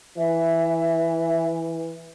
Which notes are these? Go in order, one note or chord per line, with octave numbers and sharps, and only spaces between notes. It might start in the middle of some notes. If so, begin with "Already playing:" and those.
E3 E5